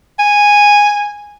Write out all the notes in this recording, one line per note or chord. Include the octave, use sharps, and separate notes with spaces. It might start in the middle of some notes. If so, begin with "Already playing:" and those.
G#5